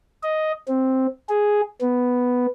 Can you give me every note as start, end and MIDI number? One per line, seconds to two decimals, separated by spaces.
0.23 0.52 75
0.68 1.07 60
1.29 1.61 68
1.81 2.46 59